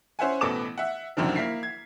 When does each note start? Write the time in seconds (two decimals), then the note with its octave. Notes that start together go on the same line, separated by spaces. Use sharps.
0.19 C#4 C5 E5 F#5 G#5
0.41 A1 B2 B3 A4 D6 E7
0.78 E5 F#5
1.17 F#1 C2 F#2 D3 D#3 F3
1.36 A#3 E4 B6 C7
1.63 G#6